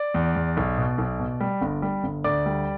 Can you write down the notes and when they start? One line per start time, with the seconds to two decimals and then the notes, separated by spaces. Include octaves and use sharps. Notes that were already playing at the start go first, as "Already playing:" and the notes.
Already playing: D5
0.14 E2
0.36 E2
0.57 B1
0.78 B2
0.98 B1
1.19 B2
1.41 G3
1.62 G1
1.82 G3
2.04 G1
2.24 D2 D5 D6
2.46 G3